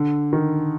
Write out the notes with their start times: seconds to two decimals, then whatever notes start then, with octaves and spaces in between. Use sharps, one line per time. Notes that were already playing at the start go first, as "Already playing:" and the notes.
Already playing: D3
0.33 D#3